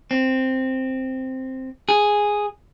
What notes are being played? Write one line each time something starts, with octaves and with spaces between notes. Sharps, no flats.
C4
G#4